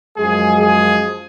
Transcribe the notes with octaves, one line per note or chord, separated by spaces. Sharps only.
F#2 F3 G#3 G#4
G#4